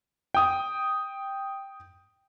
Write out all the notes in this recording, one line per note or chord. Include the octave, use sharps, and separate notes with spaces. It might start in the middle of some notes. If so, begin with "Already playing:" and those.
G5 D#6